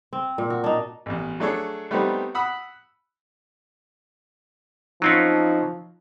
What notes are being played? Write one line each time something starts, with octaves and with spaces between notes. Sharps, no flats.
C4
A#2
F#4
D4 D#4
A1 E2
F#3 A3 D4 G#4 A4 C#5
G3 A3 B3 C4 D#4 G4
F#5 B5 D#6 E6
F3 F#3 C4 C#4 D#4